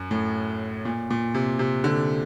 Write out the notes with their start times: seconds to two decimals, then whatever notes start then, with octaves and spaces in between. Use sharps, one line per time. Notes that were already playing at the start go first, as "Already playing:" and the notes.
Already playing: F#2
0.11 A2
0.85 A#2
1.10 A#2
1.34 C3
1.59 C3
1.84 D3